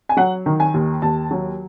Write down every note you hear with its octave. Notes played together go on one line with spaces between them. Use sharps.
G#5
F#3 F#5
D#3
G#5
D#2
D#2 A5
F#3